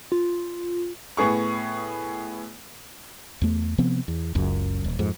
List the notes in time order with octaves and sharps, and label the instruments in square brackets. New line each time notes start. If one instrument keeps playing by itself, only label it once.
[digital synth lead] F4
[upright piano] A2 B3 G#4 C#6
[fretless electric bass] E2 A3
C3 F3 B3 C4
E2
F#1 C#2 F#2
D#1
F2 G#2